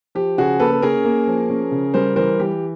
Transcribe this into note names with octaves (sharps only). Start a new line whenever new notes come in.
F3 G4
C#3 F#4 G#4
A#3 A4 B4
A4
C#4 G#4 A#4
A#3
F3
C#4
C#3
G3 A#4 C5
E3 A#4 C5
E3 G4